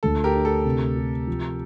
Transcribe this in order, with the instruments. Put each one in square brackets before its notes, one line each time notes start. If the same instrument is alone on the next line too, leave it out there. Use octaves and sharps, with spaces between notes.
[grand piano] D2 [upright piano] A4
[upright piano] G4 A#4
[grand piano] D4
[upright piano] A4
[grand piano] C3
G4
F3